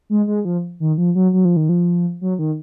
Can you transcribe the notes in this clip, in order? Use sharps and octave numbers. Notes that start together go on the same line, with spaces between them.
G#3
G#3
F3
D#3
F3
F#3
F#3
F3
D#3
F3
F#3
D#3